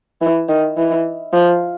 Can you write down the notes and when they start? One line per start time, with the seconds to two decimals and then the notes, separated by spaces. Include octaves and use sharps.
0.21 E3
0.49 D#3
0.77 E3
1.33 F3